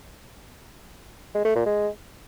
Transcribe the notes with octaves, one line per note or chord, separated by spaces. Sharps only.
G#3
A3
A#2
G#3